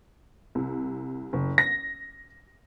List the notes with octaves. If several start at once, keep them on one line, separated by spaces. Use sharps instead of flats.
C2
F#1
A#6